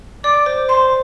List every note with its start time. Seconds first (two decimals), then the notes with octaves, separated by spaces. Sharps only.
0.24 D5 D6
0.46 C5
0.69 C5 C6